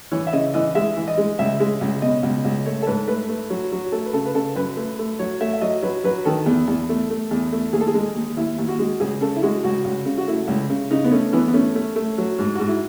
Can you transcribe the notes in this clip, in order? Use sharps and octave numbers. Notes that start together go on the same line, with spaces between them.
E3 C#5
E5
C#3 D#5
E3 D#5
G#3 E5
E3
D#5
G#3
C#2 E5
G#3
C#2
B2 D#5
C#2
C#2
A3 C#5
A4
G#2 B4
A3 B4
A3
F#3
F#3
A3 A4
B4
C#3 A4
B4
C#3 A4
F#2 B4
A3
A3
F#3 C#5
A3 E5
E5
F#3 D#5
F#3 B4
F#3 B4
D#3 A4
E2
E2
A3
A3
E2
A3
D#2 G#4
A4
G#4
G#3
D#2
D#2 E4
D#2
F#4
G#3
C#2 G#4
C#3 A4
E4
G#3 F#4
C#2 F#4
C#2
C#3
F#4
A3 E4
C#2
C#3
C#3 D#4
B3
A3 C#4
E3 B3
B3
A3 C#4
A3
A3
F#3
G#2
G#2 F#4
E4